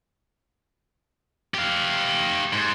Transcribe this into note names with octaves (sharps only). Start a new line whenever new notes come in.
G4 F5
G#2